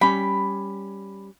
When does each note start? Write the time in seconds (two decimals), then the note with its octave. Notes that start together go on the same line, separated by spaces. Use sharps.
0.01 G3 C#4 B5